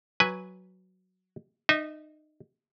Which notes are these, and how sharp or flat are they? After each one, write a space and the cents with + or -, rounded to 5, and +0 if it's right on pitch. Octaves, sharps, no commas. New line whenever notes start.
F#3 +0 B4 +0 G#5 -5
D#4 -25 E5 -40